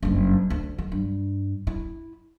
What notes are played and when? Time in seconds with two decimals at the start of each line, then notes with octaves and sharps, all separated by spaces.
0.03 F#1 G2
0.50 D2
0.78 D#3
0.92 G2
1.67 E4